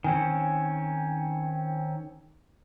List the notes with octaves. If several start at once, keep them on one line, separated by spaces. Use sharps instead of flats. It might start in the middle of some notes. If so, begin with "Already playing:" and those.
D#3 C4 C#4 G#5